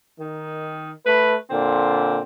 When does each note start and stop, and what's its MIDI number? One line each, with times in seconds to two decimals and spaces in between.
0.18 0.91 51
1.05 1.36 57
1.05 1.36 71
1.50 2.22 46
1.50 2.22 50
1.50 2.22 60